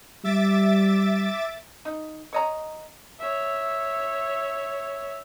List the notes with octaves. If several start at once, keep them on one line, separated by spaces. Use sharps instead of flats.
G3 E5 D6 A6
D#4
C#5 D#5 A#5
C#5 E5